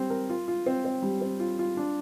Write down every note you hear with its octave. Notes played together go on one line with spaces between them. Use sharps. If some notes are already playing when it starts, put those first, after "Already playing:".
Already playing: G3 C4
A#4
F4
F4
C4
C4
G3
C4
F4
F4
D4